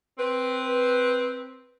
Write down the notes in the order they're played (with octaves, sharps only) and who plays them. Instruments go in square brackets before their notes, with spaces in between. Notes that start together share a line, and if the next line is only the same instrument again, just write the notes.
[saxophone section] C4 B4